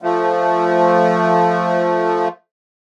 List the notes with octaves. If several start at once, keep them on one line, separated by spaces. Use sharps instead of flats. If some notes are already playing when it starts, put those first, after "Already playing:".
F3 A3